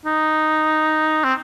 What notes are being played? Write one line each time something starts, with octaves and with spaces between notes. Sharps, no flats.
D#4
C4